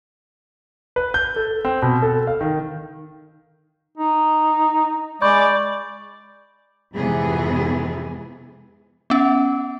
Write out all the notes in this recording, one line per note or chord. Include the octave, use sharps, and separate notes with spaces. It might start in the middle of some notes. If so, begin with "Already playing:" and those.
B4
G6
A4
C4
B2
A4
F5
D#3
D#4
G#3 D5 B5 C#6 G6
F2 G#2 C3 E3 B3 G#4
B3 C#4